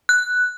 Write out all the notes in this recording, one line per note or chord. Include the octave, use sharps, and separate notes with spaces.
F#6